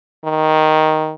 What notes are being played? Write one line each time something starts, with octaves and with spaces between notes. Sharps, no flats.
D#3